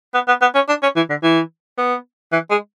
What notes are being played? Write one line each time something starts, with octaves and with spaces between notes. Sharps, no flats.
B3
B3
B3
C#4
D4
C#4
E3
D3
E3
B3
E3
G#3